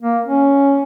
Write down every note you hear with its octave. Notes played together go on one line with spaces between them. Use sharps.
A#3
C#4